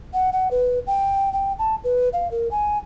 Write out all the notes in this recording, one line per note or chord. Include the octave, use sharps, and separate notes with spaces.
F#5
F#5
B4
G5
G5
A5
B4
F5
A#4
G#5